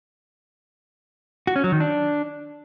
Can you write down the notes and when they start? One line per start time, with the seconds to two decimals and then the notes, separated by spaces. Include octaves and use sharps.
1.47 F#4
1.56 C#4
1.64 F#3
1.72 D#3
1.80 D4